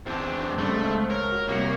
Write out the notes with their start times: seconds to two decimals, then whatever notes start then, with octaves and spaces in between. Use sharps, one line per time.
0.06 E2 C4 D4
0.58 G2 C#3 A3
0.73 C#2
1.11 A#4 C#5
1.32 F#4
1.49 C2 C3 A#3 C#7